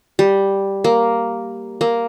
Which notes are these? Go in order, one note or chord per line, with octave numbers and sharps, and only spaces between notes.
G3
A#3
A#3